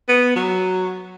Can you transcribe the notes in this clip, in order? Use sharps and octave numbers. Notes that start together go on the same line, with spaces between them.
B3
F#3